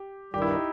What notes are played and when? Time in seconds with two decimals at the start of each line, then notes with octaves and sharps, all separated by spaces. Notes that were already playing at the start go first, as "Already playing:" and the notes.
Already playing: G4
0.34 G2 D#3 G3 G4
0.42 E4
0.51 D#4